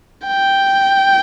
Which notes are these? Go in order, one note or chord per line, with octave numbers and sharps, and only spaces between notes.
G5